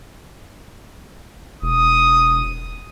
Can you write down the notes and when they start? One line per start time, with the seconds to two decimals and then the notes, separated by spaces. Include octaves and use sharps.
1.62 E1 D#6